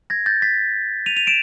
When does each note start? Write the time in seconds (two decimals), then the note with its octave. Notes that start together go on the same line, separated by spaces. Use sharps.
0.10 G#6 A#6
0.26 G6 A6
0.42 A6 B6
1.06 D#7 F7
1.16 D#7 F7
1.27 D7 E7